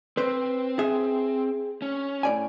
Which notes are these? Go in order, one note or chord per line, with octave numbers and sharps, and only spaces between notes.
C4 B4 C5
G#4 E5
C#4
A2 D5 G#5